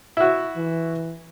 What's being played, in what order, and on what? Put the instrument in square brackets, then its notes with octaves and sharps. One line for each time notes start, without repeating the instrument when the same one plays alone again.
[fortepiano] E4 F#4
[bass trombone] E3